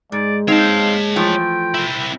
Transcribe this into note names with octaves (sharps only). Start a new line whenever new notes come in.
G#2 G#3 D5
C4 D#4 C#5 F5 A5
E3 F3 A3 G5
C4 E4